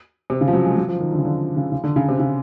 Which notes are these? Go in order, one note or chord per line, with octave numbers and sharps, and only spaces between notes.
C3
C#3
F3
F#3
G#3
F#3
F3
D#3
D3
C#3
D3
C#3
C#3
D3
C#3
C3
C#3